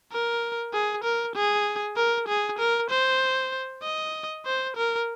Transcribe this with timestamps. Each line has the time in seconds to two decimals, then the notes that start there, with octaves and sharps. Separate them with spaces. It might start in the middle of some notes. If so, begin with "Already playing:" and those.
0.12 A#4
0.73 G#4
1.04 A#4
1.36 G#4
1.97 A#4
2.28 G#4
2.59 A#4
2.91 C5
3.83 D#5
4.45 C5
4.76 A#4